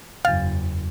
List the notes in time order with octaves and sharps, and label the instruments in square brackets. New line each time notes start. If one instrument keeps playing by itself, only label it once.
[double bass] F#1 [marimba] E2 A6 [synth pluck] F5